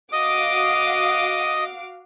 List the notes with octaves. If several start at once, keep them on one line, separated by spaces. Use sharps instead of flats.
F#4 D#5 F5 D6 D#6